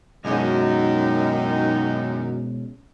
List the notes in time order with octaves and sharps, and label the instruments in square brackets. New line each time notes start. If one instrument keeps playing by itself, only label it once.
[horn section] F#2 [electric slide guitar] B2 G#3 C#4 [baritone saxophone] D#3 [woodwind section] D#4